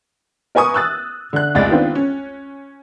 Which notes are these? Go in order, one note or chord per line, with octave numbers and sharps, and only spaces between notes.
A#4 B4 G#5 C#6 D#6
E6 F#6 A6
D3 F#6
F1 C#2 D5 D#5 A6
D#3 B3 C4 D4 F4
C#4